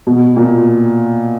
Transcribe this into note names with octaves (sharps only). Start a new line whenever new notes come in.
B2
A#2